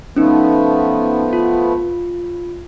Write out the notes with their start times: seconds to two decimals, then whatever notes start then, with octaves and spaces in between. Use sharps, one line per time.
0.16 F3 A3 B3 C#4 D#4
1.33 F4